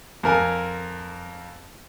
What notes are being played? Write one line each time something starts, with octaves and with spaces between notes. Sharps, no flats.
F2 A#4 G#5